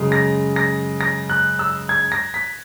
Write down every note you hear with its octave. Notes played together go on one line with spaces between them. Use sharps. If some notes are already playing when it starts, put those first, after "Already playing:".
Already playing: F#2 C#3 G#3
A#6
A#6
A#6
F#6
E6
G#6
A#6
B6